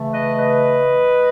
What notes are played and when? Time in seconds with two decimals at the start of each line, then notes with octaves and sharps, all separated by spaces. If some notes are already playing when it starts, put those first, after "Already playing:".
Already playing: C#3 E3 A3
0.12 B4 D#5
0.37 B4 D#5